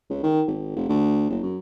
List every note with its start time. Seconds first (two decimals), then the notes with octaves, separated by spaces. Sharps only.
0.10 C#2
0.23 D#3
0.47 G#1
0.76 F1
0.89 D2
1.30 F#1
1.43 F#2